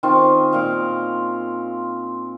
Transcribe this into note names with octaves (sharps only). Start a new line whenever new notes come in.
D#3 C4 C#4 F4
A#2 F5 D6